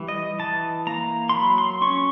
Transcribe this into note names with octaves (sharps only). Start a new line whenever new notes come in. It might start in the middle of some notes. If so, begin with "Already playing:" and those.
Already playing: E3 G3
D#5
E3 A5
A#3 A#5
C6
F#3 B5
C6
C#4 C#6